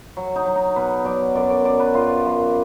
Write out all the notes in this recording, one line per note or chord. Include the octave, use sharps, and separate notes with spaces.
F#3
D#4
F#3
D#4
B2 B4
F#3 D5
F#2 D5
D5
F#2 D5
B4
F#2 F4
F#2